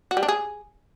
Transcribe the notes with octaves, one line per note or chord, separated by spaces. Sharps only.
F#4
G3
D4
G#4